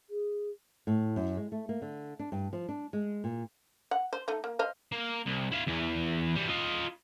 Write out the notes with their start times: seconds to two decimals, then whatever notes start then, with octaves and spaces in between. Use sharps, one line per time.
0.10 G#4
0.87 A2
1.16 F#2
1.37 G#3
1.52 A3
1.69 A#3
1.82 D3
2.19 D4
2.32 G2
2.53 F3
2.69 D4
2.93 G#3
3.24 A#2
3.91 F#5
4.13 C5
4.28 A3 D#4
4.44 A#3
4.59 C5 D#5 F5
4.92 A#3
5.26 C2
5.52 E4 F5
5.67 E2 E3
6.35 E3 G3
6.49 F4 D#5